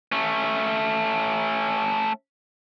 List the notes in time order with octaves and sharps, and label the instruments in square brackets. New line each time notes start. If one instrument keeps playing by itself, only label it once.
[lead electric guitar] A3 C#4